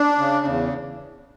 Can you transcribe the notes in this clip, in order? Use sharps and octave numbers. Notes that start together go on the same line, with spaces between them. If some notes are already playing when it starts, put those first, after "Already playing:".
Already playing: D4
C#3
E2